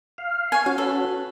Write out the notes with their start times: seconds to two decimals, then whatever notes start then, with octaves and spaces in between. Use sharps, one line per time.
0.18 F5
0.52 C#5 G#5
0.66 C#4 F#4 F5
0.78 A4 B4